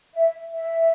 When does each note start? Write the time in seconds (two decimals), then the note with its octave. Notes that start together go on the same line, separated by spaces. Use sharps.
0.14 E5
0.54 E5